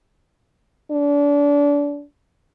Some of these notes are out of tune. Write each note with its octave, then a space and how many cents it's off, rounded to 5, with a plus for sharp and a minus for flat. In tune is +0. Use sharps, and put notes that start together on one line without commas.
D4 -30